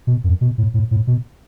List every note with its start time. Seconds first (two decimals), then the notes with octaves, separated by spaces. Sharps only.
0.07 B2
0.24 F#2
0.41 B2
0.58 A2
0.74 A2
0.91 A2
1.07 B2